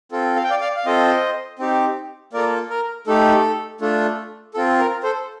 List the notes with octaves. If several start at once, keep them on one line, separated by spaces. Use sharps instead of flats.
C4 F4 A4
F5
G5
D5 F5
D5 F5
F5
C4 F4 A4 C5 D#5
C4 D#4 G4
A#3 F4 A4 A#4 D5
A#4
A3 D#4 G4 A4
A3 D4 F4 A4
C4 F4 A4
A#4
A4 C5